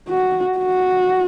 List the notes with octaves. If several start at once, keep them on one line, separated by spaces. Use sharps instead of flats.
F#4
F#4